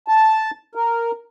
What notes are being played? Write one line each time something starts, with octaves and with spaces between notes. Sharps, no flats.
A5
A#4